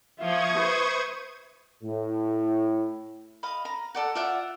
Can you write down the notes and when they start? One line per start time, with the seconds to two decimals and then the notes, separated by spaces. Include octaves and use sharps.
0.19 F3 F4 E5 C#6 D#6 G#6
0.58 B4 C5
1.83 A2
3.43 D#5 F5 B5
3.65 A#5
3.95 A4 D5 F#5
4.15 F4 D5 E5 F#5